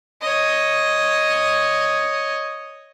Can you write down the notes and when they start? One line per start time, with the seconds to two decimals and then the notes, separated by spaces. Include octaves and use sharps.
0.22 C#5 D#5